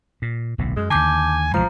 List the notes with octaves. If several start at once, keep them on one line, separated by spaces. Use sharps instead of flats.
A#2
D1 B1 A2
F#2 G#3
D#2 D3 G#5 A5 D6 G6
A1 G2 F3 G#3 A#5